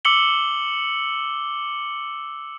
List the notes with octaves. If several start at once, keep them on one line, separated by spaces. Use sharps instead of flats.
D6 E6 C#7 F#7 G7